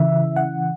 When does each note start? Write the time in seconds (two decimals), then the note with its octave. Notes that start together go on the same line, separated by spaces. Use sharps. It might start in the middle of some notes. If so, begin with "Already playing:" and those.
Already playing: C#3 E3 E5
0.36 F#5